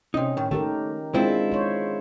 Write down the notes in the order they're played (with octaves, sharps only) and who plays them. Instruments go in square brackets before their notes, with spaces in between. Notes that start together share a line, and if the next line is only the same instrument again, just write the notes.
[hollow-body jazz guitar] C3 D#4 [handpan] C#4
[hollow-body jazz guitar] A2 D#3
[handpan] D#3 G4 A#4 [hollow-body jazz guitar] A3
[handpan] G#3 D4 [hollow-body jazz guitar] C4 E4 F4
[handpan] C5 C#5